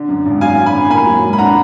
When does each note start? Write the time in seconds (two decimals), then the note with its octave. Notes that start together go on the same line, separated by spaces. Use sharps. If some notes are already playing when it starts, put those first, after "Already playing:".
Already playing: D3
0.09 F#2
0.26 G#1
0.41 F#3 F5 G#5
0.57 D3
0.66 G#5 B5
0.74 F#2
0.89 A#3 G#5 B5
1.06 F#3
1.22 G#2
1.33 B5
1.38 D4 F#5 A#5